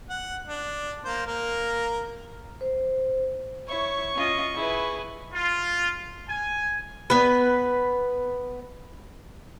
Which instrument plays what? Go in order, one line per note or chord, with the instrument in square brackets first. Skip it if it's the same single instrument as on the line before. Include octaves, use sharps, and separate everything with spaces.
[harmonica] F#5
D4
A#3 C5
A#3 A#4
[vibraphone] C5
[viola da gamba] E4 [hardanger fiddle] C#5 [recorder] C#6
[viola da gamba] C#4 F4 D#5
[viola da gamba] E4 [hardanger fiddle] G#4 B4
[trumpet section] F4
G#5
[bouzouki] B3 B4